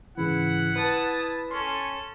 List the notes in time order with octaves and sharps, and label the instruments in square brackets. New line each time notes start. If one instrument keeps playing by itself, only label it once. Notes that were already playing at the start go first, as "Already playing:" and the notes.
[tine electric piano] G#2 C#3 E3 [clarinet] E4 [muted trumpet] F#5
[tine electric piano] B4 B5 [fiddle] A5 D#6
[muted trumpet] C#4 [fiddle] A4 [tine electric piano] C6